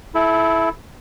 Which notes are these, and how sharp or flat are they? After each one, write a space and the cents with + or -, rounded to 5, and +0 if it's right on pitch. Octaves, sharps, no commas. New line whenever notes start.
E4 +0 A4 -25